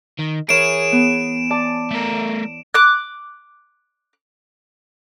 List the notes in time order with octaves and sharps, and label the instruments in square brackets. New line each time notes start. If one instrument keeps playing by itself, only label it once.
[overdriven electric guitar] D#3
[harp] E3 A#4 C#5 [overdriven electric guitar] G#4 [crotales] D7 E7
[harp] B3
D5 A5
[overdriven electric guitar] A3 A#4
[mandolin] D6 F#6